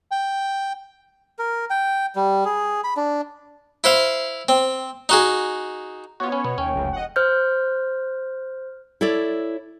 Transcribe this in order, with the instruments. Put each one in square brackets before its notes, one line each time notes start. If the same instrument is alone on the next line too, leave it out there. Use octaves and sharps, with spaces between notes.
[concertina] G5
[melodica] A#4
G5
G3
G#4
B5
D4
[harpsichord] E4 C5 F5
C4
D#4 F#4 G#4
[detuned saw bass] B3 [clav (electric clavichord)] F4 F#4 [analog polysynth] C#5
[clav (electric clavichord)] C#4 [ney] B5
[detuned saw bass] B2 [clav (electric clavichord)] B3
[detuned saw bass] D#2 [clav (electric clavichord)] C#4 [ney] G5
[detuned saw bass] F1 [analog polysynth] C#2 F#2 C#3
[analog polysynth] D#5 F#5
[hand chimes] C5 F6 G6
[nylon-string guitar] E4 A4 C#5 D5